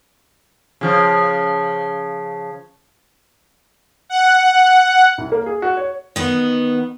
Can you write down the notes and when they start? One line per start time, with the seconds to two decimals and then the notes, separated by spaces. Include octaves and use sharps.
0.81 C#3 F3
4.09 F#5
5.18 C2
5.32 A#3
5.46 G#4
5.62 F#4
5.77 C#5
6.16 D#3 B3